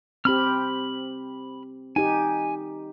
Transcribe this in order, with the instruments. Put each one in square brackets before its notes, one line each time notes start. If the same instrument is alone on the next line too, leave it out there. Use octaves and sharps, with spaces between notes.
[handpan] C4 G4 [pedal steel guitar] B5 F6
[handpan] D#4 G4 [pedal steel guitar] G#5